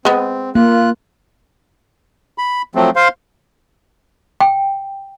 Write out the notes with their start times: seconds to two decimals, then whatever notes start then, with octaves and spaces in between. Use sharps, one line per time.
0.05 G#3 B3 C4
0.55 A#3 F4 F#6
2.38 B5
2.75 F3 F#3 A3 C4
2.96 C5 F5 C6
4.40 G5